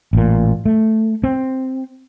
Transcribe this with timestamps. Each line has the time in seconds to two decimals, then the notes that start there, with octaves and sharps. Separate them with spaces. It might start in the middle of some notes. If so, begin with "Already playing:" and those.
0.13 A1 A#2
0.65 A3
1.24 C4